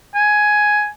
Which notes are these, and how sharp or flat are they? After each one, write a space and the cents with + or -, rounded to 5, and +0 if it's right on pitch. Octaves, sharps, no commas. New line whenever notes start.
G#5 +10